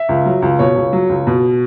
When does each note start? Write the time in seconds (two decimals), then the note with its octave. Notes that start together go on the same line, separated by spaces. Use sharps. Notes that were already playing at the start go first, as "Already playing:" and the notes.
Already playing: E5
0.09 C#2
0.26 F#3
0.42 C#2
0.59 B2 C#5
0.76 C#2
0.93 F#3
1.09 C#2
1.27 B2